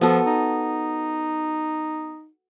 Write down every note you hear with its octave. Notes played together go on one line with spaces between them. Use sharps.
F3 B3 F#4 A4
D#4